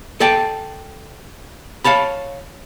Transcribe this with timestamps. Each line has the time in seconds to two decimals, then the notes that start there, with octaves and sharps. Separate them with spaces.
0.20 A4 D5 G5 A5
1.84 C#5 F5 A5 B5